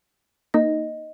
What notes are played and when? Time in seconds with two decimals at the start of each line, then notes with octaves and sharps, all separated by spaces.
0.54 A#3 D#4 D#5